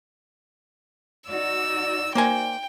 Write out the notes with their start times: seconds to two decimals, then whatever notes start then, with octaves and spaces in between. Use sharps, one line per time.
1.28 D#4 F#4 D5 E6
2.15 A#3 C5 G5 G#5